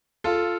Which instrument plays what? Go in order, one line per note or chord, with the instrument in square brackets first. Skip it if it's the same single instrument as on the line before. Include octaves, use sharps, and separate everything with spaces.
[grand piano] F4 A4